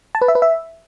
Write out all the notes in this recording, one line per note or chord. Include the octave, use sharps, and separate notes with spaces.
A5
B4
E5
B4
E5